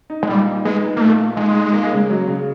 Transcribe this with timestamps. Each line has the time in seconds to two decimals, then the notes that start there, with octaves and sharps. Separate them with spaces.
0.10 D#4
0.23 G#3
0.28 A#2 G3
0.47 D#4
0.65 G#3 B3
0.83 D#4
0.97 A#3
1.01 A#2 A3
1.19 A#2
1.37 G#3 D#4
1.55 D#4
1.73 A#3
1.92 C#3
2.10 F#3
2.28 C#3